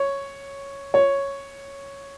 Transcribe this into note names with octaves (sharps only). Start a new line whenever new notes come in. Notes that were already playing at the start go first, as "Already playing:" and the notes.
Already playing: C#5
C#5